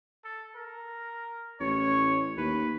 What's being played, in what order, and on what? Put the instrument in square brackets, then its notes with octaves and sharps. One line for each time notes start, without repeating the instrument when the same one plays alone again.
[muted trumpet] A4
A#4
[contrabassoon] A1 [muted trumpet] C#5
[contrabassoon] D#2 [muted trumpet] B4